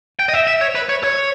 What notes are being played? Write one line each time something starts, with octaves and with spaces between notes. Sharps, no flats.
G5
D#5
E5
E5
C#5
B4
C#5
C#5